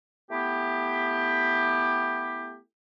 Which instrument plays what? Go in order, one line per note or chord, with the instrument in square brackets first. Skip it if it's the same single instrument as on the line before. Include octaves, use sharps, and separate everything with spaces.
[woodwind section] A3 B3 E4 G4